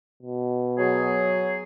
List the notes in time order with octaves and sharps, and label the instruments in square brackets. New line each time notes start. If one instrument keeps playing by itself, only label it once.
[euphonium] B2
[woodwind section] F#3 G#4